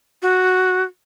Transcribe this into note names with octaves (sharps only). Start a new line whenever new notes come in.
F#4